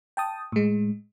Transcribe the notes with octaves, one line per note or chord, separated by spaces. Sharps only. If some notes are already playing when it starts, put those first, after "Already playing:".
G5 A5 D#6
A2 G#3